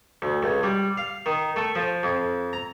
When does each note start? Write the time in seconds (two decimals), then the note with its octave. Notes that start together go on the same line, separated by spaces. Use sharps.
0.22 D2
0.43 C#2
0.63 G3
0.97 F5
1.26 D#3
1.56 A3
1.75 F3
2.03 F2
2.53 A#5